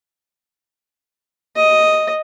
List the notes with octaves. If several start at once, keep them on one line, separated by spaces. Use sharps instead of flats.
D#5